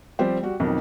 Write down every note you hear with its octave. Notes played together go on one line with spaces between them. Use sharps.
F3 G3 C4 G4 C5
G3 F#4
B1 F2 D#3